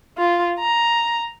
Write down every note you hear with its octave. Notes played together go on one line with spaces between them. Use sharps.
F4
A#5